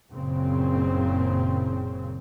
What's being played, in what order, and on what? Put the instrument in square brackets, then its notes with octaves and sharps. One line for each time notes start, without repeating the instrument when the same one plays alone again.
[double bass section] F#1 A#2 C#3 C4